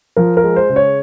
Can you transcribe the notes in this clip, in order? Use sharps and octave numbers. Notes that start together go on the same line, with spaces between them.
F3 A#4
A#4
G#3
C5
C#3
C#5